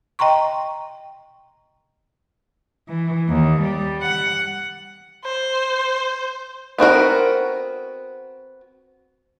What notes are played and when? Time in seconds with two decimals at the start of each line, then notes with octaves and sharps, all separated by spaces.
0.19 D#5 G5 A#5 C6 C#6
2.88 E3
3.28 D#2
3.62 G3
4.02 F#5
5.25 C5
6.78 B3 C4 F#4 A#4